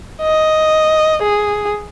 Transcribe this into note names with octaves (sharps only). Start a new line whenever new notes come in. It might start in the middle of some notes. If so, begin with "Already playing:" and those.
D#5
G#4